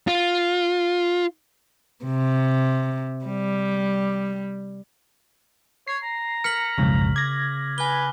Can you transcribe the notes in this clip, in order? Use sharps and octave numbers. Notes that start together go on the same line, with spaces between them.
F4
C3
G3
C#5 C7
A#5
A#4 F6 B6 C#7 F#7
B1 F2 G#2 C#3
D6 G#6 A#6
B4 G#5 G7